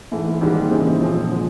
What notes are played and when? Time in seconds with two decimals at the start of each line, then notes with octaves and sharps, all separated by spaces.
0.11 G#2 E3 A3
0.41 G#2 D#3 G3 A#3
0.70 C#3 E3 G#3 C4 D#4
1.00 A#2 F3 G#3 C4
1.29 D3 F3 G#3